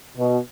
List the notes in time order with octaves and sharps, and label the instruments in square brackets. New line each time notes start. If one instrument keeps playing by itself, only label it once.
[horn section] B2